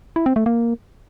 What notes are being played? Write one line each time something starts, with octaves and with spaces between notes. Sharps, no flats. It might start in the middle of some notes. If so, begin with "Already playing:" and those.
E4
C4
A3
A#3